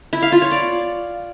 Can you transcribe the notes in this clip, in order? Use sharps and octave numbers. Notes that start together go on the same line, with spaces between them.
E4
F5
F4
C#5
D5